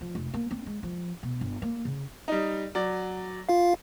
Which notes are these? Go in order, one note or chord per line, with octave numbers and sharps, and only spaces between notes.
F3
F1
A#3
C4
G#3
F3
B2
G1
A#3
C#3
G3 D#4
F#3 D5
F4 F5